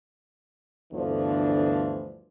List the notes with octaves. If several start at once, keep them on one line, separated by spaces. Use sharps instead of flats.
G1 D2 E3 F3 D4